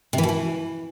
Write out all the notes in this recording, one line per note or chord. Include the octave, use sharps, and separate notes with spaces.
C3
E3
B2
E3